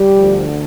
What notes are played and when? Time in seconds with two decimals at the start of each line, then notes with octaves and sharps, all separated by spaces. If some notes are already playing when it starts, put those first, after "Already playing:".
Already playing: G3 G4
0.16 D2 D3 F3